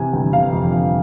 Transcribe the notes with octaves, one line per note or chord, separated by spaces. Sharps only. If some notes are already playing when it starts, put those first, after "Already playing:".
Already playing: C3 E3 G#5
G1 G5
C3 F5
F2
F2